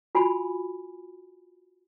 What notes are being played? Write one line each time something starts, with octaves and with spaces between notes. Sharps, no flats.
F4 F#4 G#5 B5